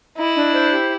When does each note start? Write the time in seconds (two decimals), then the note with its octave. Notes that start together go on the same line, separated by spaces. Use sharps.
0.17 E4 D#5
0.35 D4
0.52 C5
0.70 G4